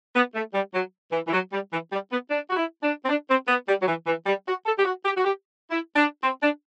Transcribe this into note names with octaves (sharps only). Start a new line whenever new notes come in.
B3
A3
G3
F#3
E3
E3
F#3
G3
E3
G3
B3
D4
F#4
E4
D4
C4
D4
C4
B3
G3
F#3
E3
E3
G3
F#4
A4
G4
F#4
G4
F#4
G4
E4
D4
C4
D4